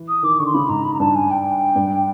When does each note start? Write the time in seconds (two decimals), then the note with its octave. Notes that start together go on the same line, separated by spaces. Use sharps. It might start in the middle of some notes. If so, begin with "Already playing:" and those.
Already playing: E3
0.08 D#6
0.23 D#3 D6
0.39 D3 C#6
0.46 C6
0.54 C#3 B5
0.69 G#2 A#5
0.84 B5
0.94 A#5
1.00 G2 A5
1.15 G#5
1.31 G5
1.76 G2